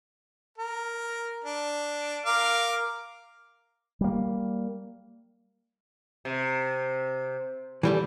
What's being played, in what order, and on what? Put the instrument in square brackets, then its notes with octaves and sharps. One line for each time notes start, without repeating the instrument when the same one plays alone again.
[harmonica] A#4
D4
A#4 F5 D6
[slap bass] G3 A#3
[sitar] C3
[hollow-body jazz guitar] E3 G3 A3